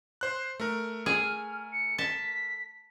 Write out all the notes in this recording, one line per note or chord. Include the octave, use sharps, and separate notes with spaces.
C5 F#6
A3 A#4
G#4 F6
C#7
A5 B6